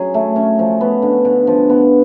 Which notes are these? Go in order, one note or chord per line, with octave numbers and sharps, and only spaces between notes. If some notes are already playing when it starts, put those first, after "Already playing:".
Already playing: F#3 C#4 G#4
A3
C#4
F3
B3
D3
D3
F3
B3